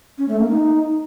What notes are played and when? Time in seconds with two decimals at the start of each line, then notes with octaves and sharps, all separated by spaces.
0.18 C#4
0.28 A3
0.39 A#3
0.49 D#4